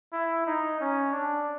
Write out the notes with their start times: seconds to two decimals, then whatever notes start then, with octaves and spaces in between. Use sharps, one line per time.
0.13 E4
0.47 D#4
0.81 C#4
1.13 D4